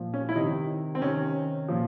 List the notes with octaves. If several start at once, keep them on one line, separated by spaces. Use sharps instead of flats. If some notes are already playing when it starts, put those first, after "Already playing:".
Already playing: A#2 F3
C#4
E4
C3 D#3 D#4
C4
C3 D#3 C#4
A#2 F3